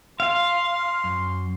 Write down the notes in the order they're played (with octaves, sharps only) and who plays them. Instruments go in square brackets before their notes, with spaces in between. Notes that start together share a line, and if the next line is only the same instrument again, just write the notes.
[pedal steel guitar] F5 [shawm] C6
[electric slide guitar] F#2